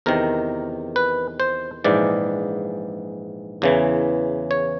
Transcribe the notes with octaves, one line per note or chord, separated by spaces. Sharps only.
E2 C3 D#3 A#4
B4
C5
A#1 G#2 E3 D5
E2 C#3 E3
C#5